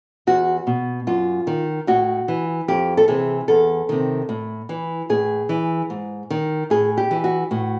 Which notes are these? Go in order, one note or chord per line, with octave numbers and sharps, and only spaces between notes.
E2 F#4
B2
F#2 F4
D#3
A2 F#4
E3
F2 G4
A4
C3 E3 G#4
E2 A4
C3 D#3
A2
E3
A2 G#4
E3
G#2
D#3
A2 G#4
G4
E3
F#4
A2 F#4